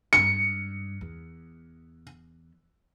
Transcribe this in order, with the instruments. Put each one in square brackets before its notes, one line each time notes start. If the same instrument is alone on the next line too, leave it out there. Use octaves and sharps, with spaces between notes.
[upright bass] G#1 G2 [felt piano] C#7
[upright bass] E2